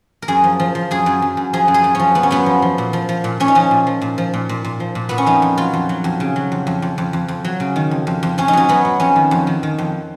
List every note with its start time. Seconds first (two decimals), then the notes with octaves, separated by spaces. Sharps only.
0.22 A#4
0.28 F#2 G#4
0.44 F3
0.60 F3
0.75 F3
0.91 F#2 G#4
1.06 F#2
1.22 F#2
1.37 F#2
1.53 F3 G#4
1.68 F#2
1.74 G#4
1.84 F#2
1.95 F3 C#4
2.15 F#2 B3
2.23 C#4
2.31 F#2 B3
2.46 F3
2.62 F3
2.78 A#2
2.93 F3
3.09 F3
3.24 A#2
3.40 A#2 C#4
3.48 D#4
3.55 F3 C#4
3.71 A#2
3.87 F3
4.02 A#2
4.18 F3
4.34 A#2
4.49 A#2
4.64 A#2
4.80 F3
4.95 A#2
5.09 A#2 B3
5.18 C#4
5.26 F2 D#4
5.42 F2
5.58 F#3 F4
5.74 F2
5.89 F#3
6.04 F2
6.20 C#3
6.36 F#3
6.52 F2
6.67 F2
6.82 F2
6.98 F2
7.13 F2
7.28 F2
7.45 F#3
7.60 C#3
7.76 D#3
7.91 F2
8.07 F2
8.23 F2
8.38 F2 C#4
8.48 D#4
8.53 F#3 C#4
8.69 F#3 B3
8.85 F#3
9.00 F2 C#4
9.16 D#3
9.31 F2
9.47 D#3
9.63 D#3
9.78 F2